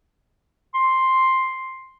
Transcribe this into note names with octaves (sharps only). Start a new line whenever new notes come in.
C6